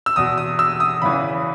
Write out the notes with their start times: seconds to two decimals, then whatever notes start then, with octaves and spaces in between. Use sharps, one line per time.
0.06 E6
0.16 E2 B2 D#6
0.38 D#6
0.59 E6
0.80 D#6
1.02 E2 C#3 E3 B5